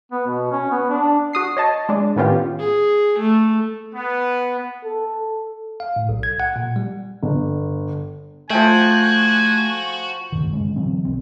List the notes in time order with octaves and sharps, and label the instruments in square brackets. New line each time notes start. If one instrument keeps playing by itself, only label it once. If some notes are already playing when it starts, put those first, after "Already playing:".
[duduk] B3
B2
C#4
B3
D4
[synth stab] F#4 D#6 C7
C#5 D#5 A5
G#3 D4
A2 D#3 B3 C#4 F4 G4
[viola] G#4
A3
[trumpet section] B3
[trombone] A4
[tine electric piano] F5
A2
B1
G#6
F#5
A#2
G3
[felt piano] G1
[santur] F3 G5 [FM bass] A3 [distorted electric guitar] F#4 [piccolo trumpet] G#5
[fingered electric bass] D2 G2 D#3
D3 G#3 C#4
D3 E3 F#3 C4
B1 C4